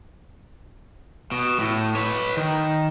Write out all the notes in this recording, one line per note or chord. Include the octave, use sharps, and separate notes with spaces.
B2
A2
B4 C#5
D#3